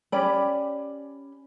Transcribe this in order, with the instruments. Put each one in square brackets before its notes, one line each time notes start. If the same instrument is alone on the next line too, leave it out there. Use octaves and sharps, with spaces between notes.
[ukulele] C#4 G4 D5 B5